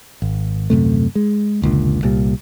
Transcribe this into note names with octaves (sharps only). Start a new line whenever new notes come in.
G#1
D#1 F#2 C3 A3
G#3
F1 C#2 A#2 D3
C2 A#2 G3